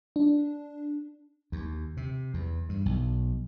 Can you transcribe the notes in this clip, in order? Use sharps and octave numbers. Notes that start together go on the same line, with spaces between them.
D4
D#2
C3
E2
G2
B1